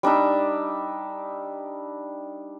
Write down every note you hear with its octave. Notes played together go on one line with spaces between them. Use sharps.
G3 D4 D#4 E5